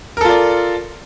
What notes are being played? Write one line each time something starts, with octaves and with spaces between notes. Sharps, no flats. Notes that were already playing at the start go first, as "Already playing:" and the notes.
F4 A4 A#4 D5